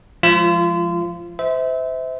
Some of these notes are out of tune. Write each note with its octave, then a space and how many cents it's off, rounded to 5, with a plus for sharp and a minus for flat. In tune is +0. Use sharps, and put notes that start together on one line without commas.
F3 +0 G#3 +0 F4 -30
C5 -30 E5 -25